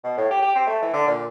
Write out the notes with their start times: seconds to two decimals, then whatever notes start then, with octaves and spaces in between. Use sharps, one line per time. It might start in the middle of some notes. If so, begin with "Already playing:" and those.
0.04 B2
0.17 A2
0.30 G4
0.42 G4
0.55 C4
0.67 A3
0.82 E3
0.94 D3
1.07 A#2